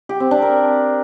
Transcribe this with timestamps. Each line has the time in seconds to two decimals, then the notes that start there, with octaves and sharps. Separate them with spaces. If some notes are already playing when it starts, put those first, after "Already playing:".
0.09 G4
0.20 C4
0.31 D4
0.42 A#4